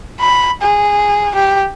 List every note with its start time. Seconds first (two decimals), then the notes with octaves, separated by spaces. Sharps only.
0.20 B5
0.62 G#4
1.35 G4